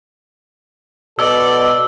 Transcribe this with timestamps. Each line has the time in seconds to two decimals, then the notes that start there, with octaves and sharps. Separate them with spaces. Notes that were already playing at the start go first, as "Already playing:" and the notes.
1.19 B2 A4 D5 E6